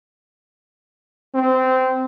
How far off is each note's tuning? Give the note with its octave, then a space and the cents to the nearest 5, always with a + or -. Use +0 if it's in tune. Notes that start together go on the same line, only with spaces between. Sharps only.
C4 -20